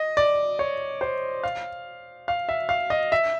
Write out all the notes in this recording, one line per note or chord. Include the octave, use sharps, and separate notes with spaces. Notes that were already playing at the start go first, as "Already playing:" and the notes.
Already playing: D#5
D5
C#5
C5
F5
F5
E5
F5
D#5
E5